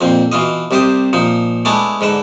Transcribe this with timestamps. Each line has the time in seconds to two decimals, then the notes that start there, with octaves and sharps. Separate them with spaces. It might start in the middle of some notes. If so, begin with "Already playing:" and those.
0.01 F2 A#2 C4
0.32 B2 E3 F4 D#5
0.71 C2 C3 G4 C5 C6 D#6
1.13 A#2 F3 D#4
1.65 G#3 A3 B3 D4 E4 G#4
2.01 G#2 D3 B4 E5